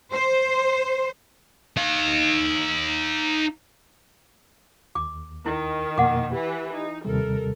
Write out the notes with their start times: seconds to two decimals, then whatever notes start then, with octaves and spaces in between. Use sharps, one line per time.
0.14 C5
1.77 D#4 F5
4.95 D#2 D6
5.46 D#3 E4
5.98 F2 B2 A#3 F#5 D6
6.32 E3 G4 B4
6.73 D#4
7.05 D#2 C3 G3 A4 A#4